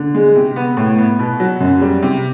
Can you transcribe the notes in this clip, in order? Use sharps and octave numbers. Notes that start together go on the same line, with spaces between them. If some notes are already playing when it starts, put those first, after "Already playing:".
Already playing: D3
G#3
C3
B3
A2
B3
B2
F#3
F#2
G3
C3